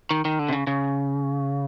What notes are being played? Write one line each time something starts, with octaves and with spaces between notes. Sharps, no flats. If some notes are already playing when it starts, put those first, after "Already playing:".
D#3
D#3
D3
C3
C#3
C#3